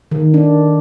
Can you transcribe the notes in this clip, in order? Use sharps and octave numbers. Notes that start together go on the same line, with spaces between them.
D#3
D4